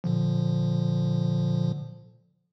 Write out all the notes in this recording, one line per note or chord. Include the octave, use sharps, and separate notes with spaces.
A#2 D3 F3